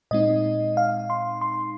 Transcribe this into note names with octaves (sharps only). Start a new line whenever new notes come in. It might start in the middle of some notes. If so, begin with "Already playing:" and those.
A#2 G#3 C4 D#4 D#5
F5
C6
C6